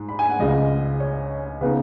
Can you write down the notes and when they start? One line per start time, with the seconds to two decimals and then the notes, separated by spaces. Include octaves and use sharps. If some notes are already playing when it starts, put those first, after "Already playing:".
Already playing: G#2
0.09 B5
0.19 G#5
0.30 F#5
0.39 C#2 C#3 G#3 D#5
1.00 C#5
1.61 C#3 B3 D#4 B4